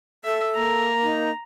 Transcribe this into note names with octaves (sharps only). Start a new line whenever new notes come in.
A4 E5
A#3 A#5
D#4